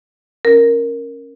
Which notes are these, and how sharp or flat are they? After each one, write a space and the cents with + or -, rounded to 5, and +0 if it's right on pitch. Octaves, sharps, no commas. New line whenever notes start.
C#4 -10 A#4 +0